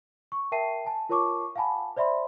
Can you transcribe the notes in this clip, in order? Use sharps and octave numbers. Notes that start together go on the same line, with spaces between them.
C#6
A#4 E5 G5 A5 C7 D#7
G#5 A5
F4 A#4 C#5 A5 C#6 D6
F5 F#5 G#5 A5 B5
C5 D5 E5 B5 C6